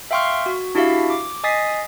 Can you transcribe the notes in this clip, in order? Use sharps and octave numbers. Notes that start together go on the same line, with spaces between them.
E5 F5 G5 C6 C#6 F6
F#4
D4 E4 F#4 G4 E5 F5
D6
D#5 G#5 D#6 A6 B6 C7